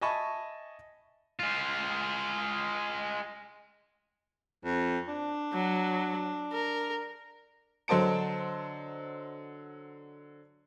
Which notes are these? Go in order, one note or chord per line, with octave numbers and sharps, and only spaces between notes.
D#5 E5 G#5 A5 B5 C#6
G#3 F4
F2
D4
F#3
A#4
D3 F#3 C5 D#5 A5 D7